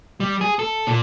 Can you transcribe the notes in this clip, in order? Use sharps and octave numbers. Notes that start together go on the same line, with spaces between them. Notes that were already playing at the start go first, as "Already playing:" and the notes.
G3
G#4
A4
A#2